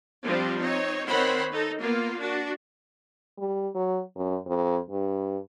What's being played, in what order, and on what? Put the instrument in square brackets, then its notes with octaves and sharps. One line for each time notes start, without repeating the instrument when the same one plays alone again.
[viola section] F3 G3 C4 D4
C4 D#4 C#5
D#3 C4 C5 C#5 F#5 B5
D#4 A4
A#3 B3 F4
D4 F#4
[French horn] G3
F#3
F#2
F2
G2